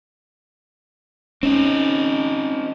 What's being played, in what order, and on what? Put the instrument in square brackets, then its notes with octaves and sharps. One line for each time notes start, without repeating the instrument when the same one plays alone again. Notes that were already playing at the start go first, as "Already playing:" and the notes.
[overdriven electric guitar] C4 D#4 [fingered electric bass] C#4